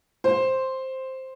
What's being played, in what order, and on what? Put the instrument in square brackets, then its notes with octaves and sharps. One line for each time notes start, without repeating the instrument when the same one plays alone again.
[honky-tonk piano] C5